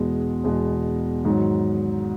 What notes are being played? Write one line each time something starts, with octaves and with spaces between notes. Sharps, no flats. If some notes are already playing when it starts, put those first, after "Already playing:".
Already playing: E2 B2 G#3 B3
E2 B2 G#3 B3
G#2 D#3 F#3